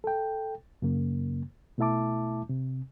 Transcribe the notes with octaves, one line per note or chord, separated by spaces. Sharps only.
A4 G5
F#2 C#3 A#3
B2 A3 E4 E5 A5 D6
C3